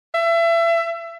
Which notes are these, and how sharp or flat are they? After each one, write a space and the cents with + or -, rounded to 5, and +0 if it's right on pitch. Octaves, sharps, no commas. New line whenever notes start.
E5 +30